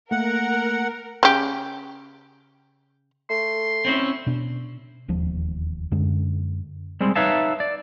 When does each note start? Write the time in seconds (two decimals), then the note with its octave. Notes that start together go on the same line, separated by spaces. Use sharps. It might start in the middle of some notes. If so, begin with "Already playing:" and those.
0.11 A3 A#3 A#4 F#5
1.23 C#3 G4
3.30 A3 C6
3.85 C4 C#4 E4
4.26 B2 D4
5.08 E1 D#2 F3
5.92 F#2 D3 G#3
7.00 G3 G#3 C4
7.15 D#4 B4 C#5 E5 F5 A5
7.60 D5